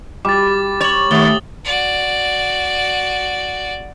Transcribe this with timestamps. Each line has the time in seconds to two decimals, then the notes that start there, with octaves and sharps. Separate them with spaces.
0.25 G3 D6 A6
0.81 C#5 A6 F#7
1.11 D#2 A3 D#6 A6 G7
1.65 F#4 D5